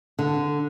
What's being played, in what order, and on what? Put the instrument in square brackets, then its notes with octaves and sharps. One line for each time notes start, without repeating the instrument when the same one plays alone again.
[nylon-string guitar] D3